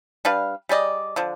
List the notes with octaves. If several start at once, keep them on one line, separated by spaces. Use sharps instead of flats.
G3 D4 B4 F5
G3 G#4 D5 D#5
D3 F3 D4